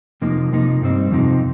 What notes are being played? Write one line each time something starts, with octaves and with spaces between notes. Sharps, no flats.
F2 C3 F3 A#3 D#4
C3 F3 A#3 D#4
G2 G3 C4 D#4
F2 C3 F3 C4 D#4